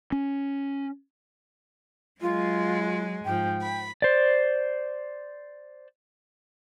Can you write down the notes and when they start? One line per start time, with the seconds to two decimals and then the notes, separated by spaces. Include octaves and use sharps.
0.12 C#4
2.21 F#3 G#3 F4
3.25 G#2 F3 G5
3.62 B5
4.02 C5 D5